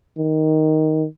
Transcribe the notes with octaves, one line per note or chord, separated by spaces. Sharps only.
D#3